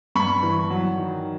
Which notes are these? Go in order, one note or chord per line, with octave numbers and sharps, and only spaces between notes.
G2 B5 C#6
E3
F#3
D#3